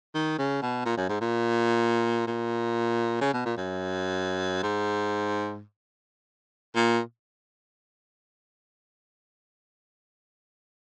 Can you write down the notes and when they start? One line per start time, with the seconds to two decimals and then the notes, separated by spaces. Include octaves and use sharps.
0.15 D#3
0.38 C#3
0.62 B2
0.85 A#2
0.97 F#2
1.09 G#2
1.21 A#2
2.27 A#2
3.21 C#3
3.34 B2
3.45 A#2
3.57 F#2
4.63 G#2
6.75 A#2